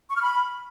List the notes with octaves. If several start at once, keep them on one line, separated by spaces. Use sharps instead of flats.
C#6
F6
B5